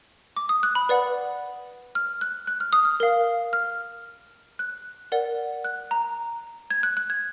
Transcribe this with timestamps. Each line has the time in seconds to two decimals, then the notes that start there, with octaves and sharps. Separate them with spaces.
0.36 D6
0.49 D#6
0.63 F#6
0.75 B5
0.89 B4 D5 F#5
1.95 F6
2.21 F#6
2.47 F#6
2.60 F6
2.73 D#6
2.85 F6
3.00 A#4 F5
3.53 F6
4.59 F#6
5.12 A#4 D5 F#5
5.64 F#6
5.91 A#5
6.70 G#6
6.83 F#6
6.97 F#6
7.10 G#6